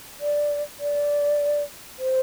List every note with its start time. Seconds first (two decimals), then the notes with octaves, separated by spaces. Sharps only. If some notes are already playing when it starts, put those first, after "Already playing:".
0.21 D5
0.80 D5
1.99 C5